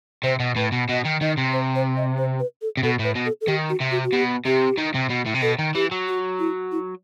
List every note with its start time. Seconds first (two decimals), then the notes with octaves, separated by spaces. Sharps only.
0.23 C3 C5
0.40 B2
0.56 A2 B4
0.72 B2
0.89 B2 D#5
1.05 D#3
1.21 D#3 D#5
1.37 C3
1.53 C5
1.75 C5
1.97 D#5
2.18 C5
2.40 B4
2.62 A4
2.77 C3
2.83 B2 A4
2.99 A2 B4
3.16 B2
3.26 A4
3.41 A4
3.48 D#3 G4
3.69 F#4
3.80 C3
3.91 F#4
4.05 F#4
4.13 B2 G4
4.45 C3 G4
4.78 D#3
4.94 C3
5.10 B2
5.26 A2
5.35 C3
5.42 B2 A4
5.59 D#3
5.75 E3 G4
5.91 F#3
6.08 F#4
6.39 E4
6.72 E4